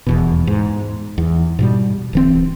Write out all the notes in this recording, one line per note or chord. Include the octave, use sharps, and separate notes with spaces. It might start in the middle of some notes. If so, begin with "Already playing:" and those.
D#1 E2 B2
G#2
E2
G#2 B2 G3
D1 E3 C4